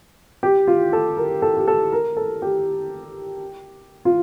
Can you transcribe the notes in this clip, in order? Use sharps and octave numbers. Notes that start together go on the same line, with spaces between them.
G4
F4
A4
A#4
A4
G4
A4
A#4
A4
G4
F4